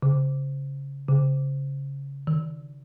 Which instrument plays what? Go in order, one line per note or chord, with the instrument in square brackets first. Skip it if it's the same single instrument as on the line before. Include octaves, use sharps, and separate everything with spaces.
[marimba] C#3
C#3
D#3